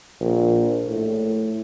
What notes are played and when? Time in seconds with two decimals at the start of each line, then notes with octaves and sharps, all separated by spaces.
0.21 A#1
0.87 A2